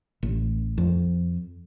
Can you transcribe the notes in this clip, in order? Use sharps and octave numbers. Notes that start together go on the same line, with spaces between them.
A1
F2